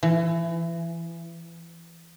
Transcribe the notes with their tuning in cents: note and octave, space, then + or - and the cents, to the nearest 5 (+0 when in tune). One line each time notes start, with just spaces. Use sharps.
E3 +25